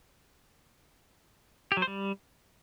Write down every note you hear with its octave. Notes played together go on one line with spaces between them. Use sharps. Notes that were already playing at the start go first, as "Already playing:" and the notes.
G4
F#3
C5
G3